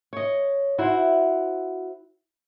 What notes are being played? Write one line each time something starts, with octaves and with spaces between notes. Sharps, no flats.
C#5 D#5
E4 F#4 C5